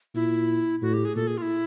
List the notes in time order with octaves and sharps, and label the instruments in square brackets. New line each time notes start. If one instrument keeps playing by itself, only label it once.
[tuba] A#2 [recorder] E4
[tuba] A2 [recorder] F#4
[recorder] G4
G#4
[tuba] A#2 [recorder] A4
[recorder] G#4
F4
E4